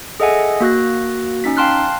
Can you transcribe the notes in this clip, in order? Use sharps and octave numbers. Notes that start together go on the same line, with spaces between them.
G#4 A4 D#5 E5 F#5 G#5
A#3 F#4 F#6 A#6
C#4 D#4 B6
F5 G5 A5 C6 F6 F#6